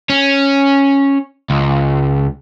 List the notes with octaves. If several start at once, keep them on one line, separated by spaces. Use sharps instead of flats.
C#4
C#2